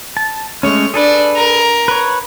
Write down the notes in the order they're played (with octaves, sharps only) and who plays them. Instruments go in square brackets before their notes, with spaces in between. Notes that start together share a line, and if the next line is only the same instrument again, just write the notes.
[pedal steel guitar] A5
[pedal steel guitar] G#3 A3 C#4 [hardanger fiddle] C#5
[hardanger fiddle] D4 D5 [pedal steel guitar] G#4 A4 B4
[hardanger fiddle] A#4
[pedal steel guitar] B4 C#5